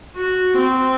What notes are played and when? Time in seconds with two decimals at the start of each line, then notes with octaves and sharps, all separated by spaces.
0.16 F#4
0.57 C4